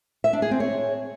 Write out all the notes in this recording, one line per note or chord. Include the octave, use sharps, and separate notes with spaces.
E5
D4
G#4
C4
C#5